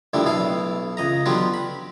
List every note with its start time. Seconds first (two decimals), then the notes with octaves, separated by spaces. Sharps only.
0.13 A#1 A2 D3 G3 A4
0.26 B1 B2 E4 A4 F5
0.97 C#2 D#5 A#5
1.26 D3 F#3 B3 F4 G4
1.54 B5